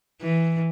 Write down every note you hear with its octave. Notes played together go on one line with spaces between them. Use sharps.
E3